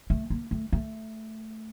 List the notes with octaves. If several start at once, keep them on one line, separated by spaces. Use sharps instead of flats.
A3
A#3
A3
A3